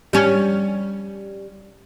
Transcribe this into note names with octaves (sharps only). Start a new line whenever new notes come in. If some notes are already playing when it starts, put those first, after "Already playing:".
G3 C#4